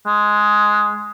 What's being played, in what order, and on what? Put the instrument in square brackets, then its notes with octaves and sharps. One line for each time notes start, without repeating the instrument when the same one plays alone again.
[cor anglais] G#3